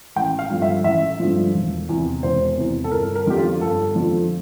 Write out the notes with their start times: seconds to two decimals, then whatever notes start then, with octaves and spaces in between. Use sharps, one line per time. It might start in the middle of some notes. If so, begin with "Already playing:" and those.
0.16 A1 G5
0.39 F5
0.50 G2 D3 F3
0.62 E5
0.84 A1 E5
1.20 G2 D3 F3
1.54 E1
1.89 E2 C3
2.23 E1 C5
2.57 E2 C3
2.84 A4
2.91 G1 A#4
3.15 A#4
3.27 F2 D3 F3 G4
3.37 F4
3.61 G1 A4
3.95 F2 D3 F3